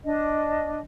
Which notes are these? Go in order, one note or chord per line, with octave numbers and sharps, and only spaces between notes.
D4 D#5